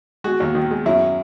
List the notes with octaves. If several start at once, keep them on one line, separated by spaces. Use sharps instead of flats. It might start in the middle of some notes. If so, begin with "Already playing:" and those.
G#3 F#4
D#2
D#3
G#3
F#2 E4